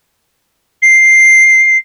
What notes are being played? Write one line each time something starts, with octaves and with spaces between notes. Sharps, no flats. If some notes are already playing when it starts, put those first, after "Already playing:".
C7